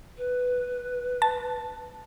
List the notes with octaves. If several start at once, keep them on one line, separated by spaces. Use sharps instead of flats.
B4
A5